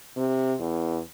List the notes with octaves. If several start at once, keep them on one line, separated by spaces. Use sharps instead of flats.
C3
E2